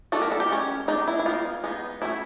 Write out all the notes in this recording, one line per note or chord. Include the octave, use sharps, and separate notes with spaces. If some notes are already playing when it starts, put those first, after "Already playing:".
D#3 F#3 B3 D4 A4
A#4
A4
G4
G#3 C#4
G#3 B3 D4 D#4
E4
E4
G#3 B3 D#4 F4
G#3 B3 D#4
F#3 A3 C#4 E4